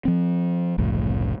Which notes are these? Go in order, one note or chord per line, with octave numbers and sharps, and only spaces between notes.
F3 C4
F#1 C2 A2 F3